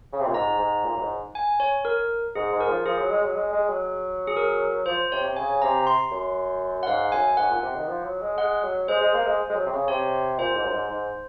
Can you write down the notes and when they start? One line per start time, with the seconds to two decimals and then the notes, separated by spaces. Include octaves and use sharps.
0.13 C#3
0.20 C3
0.27 A#2
0.34 G#2 A#5
0.59 G#2
0.84 A#2
0.96 F#2
1.02 G#2
1.35 G#5
1.60 C#5
1.85 A#4
2.35 G#2 G#4
2.52 G#2
2.60 A#4
2.69 F3
2.85 F3 G#4
2.98 F#3
3.11 G#3
3.23 F#3
3.35 G#3
3.52 G#3
3.69 F#3
4.27 G#4
4.36 A#4
4.86 F3 C5
5.12 C3 C#5
5.23 C3
5.36 C#3 G#5
5.62 C3 A#5
5.87 C6
6.11 F#2
6.83 F#5
6.87 G#2 F5
7.12 F#2 G#5
7.37 G#2 F#5
7.50 A#2
7.62 C3
7.75 D#3
7.87 F3
8.04 F#3
8.21 G#3
8.37 G#3 F#5
8.64 F#3
8.88 G#3 C5
9.01 G#3
9.14 A#3
9.26 G#3
9.49 G#3
9.55 F#3
9.66 C3
9.71 C#3
9.88 C3 C#5
10.39 A#2 C5
10.55 G#2
10.65 F#2
10.72 G#2
10.90 G#2